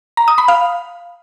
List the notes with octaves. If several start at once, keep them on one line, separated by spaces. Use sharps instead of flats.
A#5
D#6
B5
F5